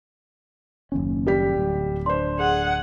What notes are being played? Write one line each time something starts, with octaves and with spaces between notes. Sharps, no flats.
F#1 D#2 C#4
G3 G4 B6
D1
D4 C5 C6
G#4 F#5